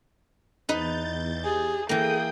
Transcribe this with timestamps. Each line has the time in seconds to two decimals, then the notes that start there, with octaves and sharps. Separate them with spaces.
0.69 E2 D#4 B4 G6 A6
1.44 G4 G#4
1.89 E3 A#3 G#4 A4 G5 D#6